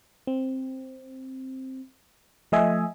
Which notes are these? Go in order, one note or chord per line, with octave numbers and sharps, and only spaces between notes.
C4
F3 A3 D#5 E5 G#5